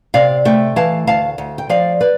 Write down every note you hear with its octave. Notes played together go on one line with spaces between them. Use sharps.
C3 D5 F5
A3 E5 G5
E3 F5 A5
D2 F5 A5
D2
G5
F3 D5 F5
B4 D5